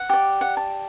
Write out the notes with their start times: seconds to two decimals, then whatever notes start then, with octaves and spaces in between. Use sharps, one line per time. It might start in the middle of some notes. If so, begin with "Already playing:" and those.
Already playing: F#5
0.09 G4 D5
0.41 F#5
0.57 A5